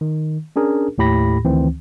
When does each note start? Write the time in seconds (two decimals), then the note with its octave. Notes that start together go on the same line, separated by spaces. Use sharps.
0.01 D#3
0.56 C#4 D4 G#4 A#4
0.98 D#2 A2 G4 B5 A#6
1.45 D2 D#3 E3 C4